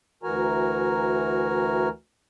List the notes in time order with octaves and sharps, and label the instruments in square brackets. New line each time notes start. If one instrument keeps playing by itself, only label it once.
[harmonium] D2 E3 F#4 A#4 G#5 A#5